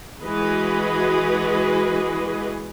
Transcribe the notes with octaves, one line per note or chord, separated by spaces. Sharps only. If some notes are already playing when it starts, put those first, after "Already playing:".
E3 G#3 F#4 G#4 B4 D#5